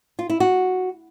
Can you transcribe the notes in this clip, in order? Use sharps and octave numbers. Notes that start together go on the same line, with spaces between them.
F4
E4
F#4